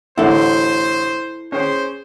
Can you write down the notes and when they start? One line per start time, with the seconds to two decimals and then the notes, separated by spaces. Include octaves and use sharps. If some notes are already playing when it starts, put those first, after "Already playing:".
0.18 A1 D3 E4 A4 C5 F#5
1.52 C#4 G#4 C5 G5